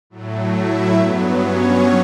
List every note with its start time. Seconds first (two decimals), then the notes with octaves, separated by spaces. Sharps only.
0.10 A2 F#3 A3
0.52 E4 E5
0.94 G2 F#3 B3
1.36 C#4 C#5